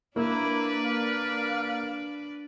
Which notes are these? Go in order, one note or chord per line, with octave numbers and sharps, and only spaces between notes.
A#3 D4 E4 B4 D5
F5